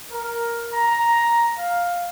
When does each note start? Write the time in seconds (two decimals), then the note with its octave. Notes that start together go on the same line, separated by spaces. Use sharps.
0.11 A#4
0.73 A#5
1.58 F5